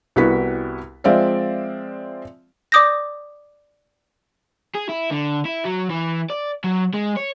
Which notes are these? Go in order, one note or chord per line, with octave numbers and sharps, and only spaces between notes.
C2 B3 E4 F#4 B6
F3 G#3 C4 D5 E5 F5
D5 D6 D#6 G6 A#6
G#4
E4
D3
E4
F#3
E3
D5
F#3
G#3
C#5